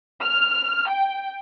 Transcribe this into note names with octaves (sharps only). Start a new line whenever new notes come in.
F6
G5